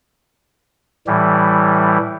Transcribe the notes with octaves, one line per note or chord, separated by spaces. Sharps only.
A2 E3 G3